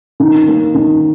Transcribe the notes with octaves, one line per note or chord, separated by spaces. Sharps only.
D#3
A#3
D#3